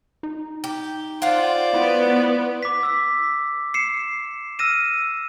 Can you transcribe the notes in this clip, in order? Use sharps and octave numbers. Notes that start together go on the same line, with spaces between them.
D#4
G4
F4 C5 D5 F5 F#5
B3 E4
D6 B6
E6 B6
C7 C#7 E7
E6 F6 A#6 D#7 E7